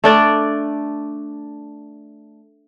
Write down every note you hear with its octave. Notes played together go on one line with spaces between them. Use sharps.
A3 D4 D5